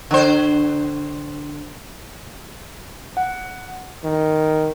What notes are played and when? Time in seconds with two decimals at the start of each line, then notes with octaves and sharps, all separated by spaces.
0.11 D3 C5
3.17 F#5
4.04 D#3